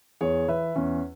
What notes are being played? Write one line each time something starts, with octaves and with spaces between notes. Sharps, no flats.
E2 G#4 C#5
E3 B4 E5
E2 C#4